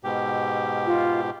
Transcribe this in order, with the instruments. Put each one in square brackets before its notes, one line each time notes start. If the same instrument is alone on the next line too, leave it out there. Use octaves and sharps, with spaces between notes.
[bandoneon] G#2 B2 G4
[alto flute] F4